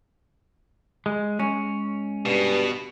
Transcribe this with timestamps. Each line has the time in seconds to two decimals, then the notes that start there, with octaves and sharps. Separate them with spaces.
1.06 G#3
1.40 G#3 C#4
2.26 G2 B2